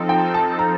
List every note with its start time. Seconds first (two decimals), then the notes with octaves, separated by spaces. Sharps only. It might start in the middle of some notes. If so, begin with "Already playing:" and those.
Already playing: F3 C4 D#4 A4
0.09 G5
0.34 A5
0.59 A#5